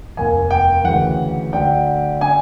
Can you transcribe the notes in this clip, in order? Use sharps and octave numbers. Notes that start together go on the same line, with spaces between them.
F1 D#2 D#3 G#5
G5
D2 C#3 E3 F#5
D2 D3 G5
D3 G#5